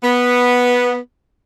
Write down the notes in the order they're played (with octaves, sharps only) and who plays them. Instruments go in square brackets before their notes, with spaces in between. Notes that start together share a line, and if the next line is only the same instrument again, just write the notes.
[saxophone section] B3